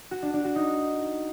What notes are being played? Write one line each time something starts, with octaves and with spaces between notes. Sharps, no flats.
F#4
D4
D4
F#4
D#4